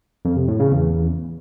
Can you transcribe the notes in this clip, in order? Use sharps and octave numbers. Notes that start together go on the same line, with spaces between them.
F2
C3
A2
C#3
E2